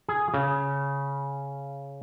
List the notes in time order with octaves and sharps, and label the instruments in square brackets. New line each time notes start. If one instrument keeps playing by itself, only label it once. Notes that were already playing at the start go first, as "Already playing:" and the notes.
[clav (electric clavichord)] G#4
C#3